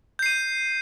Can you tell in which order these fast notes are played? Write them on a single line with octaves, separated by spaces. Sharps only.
G6 C7 D#7